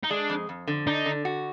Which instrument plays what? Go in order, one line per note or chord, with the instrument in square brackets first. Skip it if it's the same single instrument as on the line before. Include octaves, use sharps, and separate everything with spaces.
[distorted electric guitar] D#4
[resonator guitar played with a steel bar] G#3 [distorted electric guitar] D4
[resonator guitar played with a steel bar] F2
F2
D3
[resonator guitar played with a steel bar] D4 [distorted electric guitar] D#4
[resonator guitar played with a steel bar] D3
F#4